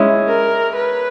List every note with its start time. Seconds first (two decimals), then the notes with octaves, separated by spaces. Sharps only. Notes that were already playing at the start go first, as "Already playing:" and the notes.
Already playing: G#3 C#4 E4
0.28 A#4
0.75 B4